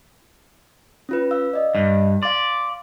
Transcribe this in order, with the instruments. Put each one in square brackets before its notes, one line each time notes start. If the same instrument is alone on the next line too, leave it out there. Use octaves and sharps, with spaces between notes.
[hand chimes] C#4 F4 B4
F5 E6
D5 D#5
[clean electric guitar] G2
[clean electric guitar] D5 [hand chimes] F5 C6